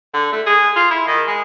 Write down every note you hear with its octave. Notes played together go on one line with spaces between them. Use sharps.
D3
A3
G#4
F4
E4
D#3
G#3